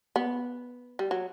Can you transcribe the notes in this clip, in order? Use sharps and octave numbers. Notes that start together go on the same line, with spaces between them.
B3
G3
F#3